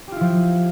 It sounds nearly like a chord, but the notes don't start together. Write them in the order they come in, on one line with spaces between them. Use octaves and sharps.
G4 F4 E4 F3